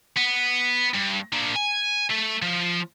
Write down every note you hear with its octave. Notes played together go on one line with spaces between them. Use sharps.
B3
G2
A#3 D4
G#5
A3
F3